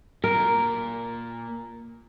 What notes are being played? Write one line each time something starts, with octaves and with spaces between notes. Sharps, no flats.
A#2 A#4